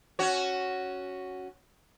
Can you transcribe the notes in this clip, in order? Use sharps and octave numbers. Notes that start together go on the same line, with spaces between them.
C#4 F#4 C#5